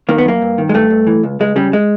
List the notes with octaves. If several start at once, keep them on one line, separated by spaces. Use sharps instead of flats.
D#3 A#3
B3
F#2 A#3
G2
D#3
G#3
G2 A3
G2
E3
C#2
C#2 G#3
C#3 G3
G#3